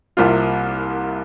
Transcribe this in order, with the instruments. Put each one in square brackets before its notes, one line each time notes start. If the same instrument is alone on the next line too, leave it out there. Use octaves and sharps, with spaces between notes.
[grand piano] C2 C3 G3 A#3 F4